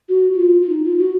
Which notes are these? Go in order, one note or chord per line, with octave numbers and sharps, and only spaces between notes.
F#4
F#4
F4
F4
D#4
F4
F#4